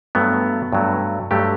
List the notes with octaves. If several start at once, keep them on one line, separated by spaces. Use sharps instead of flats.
G2 F#3 A3 B3
G2 F#3 A3
G2 F#3 A3 G4